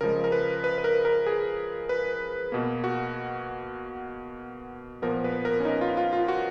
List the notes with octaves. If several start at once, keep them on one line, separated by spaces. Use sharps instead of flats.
C#3 F3 G#3 A#4
A#4
B4
B4
B4
A#4
A#4
G#4
B4
B2 A#3
F#4
A#2 F3 B3 A#4
B4
A#4
C#4
D#4
F4
F4
F4
F#4